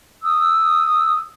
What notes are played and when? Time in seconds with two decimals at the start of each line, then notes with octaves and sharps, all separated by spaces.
0.25 D#6 E6